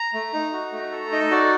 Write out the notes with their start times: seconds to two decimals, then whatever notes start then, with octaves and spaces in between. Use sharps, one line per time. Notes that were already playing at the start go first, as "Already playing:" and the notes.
Already playing: A#5
0.14 A3
0.33 D#4
0.53 F#4
0.73 A3
0.91 A4
1.12 D#4 D#5
1.31 F#4 D5